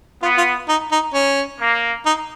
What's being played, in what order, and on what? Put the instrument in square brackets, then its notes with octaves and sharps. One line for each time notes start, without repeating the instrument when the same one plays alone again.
[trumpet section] B3 [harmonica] F4
[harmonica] F4
D#4
D#4
C#4
[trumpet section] A#3
[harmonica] D#4